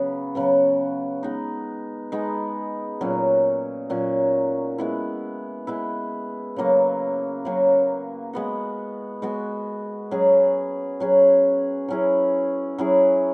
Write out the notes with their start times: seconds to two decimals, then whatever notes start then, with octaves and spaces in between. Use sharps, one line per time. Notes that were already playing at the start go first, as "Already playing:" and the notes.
Already playing: C#3 F#3 B3
0.35 C#3 F#3 B3
1.23 G#3 B3 D#4
2.12 G#3 B3 D#4
3.01 A#2 F#3 C#4
3.90 A#2 F#3 C#4
4.78 G#3 B3 E4
5.67 G#3 B3 E4
6.56 C#3 F#3 A#3
7.45 C#3 F#3 A#3
8.33 G#3 B3 F#4
9.22 G#3 B3 F#4
10.11 F#3 C#4 G#4
11.00 F#3 C#4 G#4
11.88 F#3 C#4 E4 G#4
12.78 F#3 C#4 E4 G#4